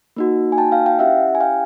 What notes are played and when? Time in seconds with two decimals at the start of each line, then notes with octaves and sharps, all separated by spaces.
0.16 A#3 D#4 F#4
0.52 G#5
0.58 G5 A5
0.72 F5 G5
0.86 F5 G5
0.99 C#4 E4 G4 E5 F#5
1.35 G#5
1.40 F5 G5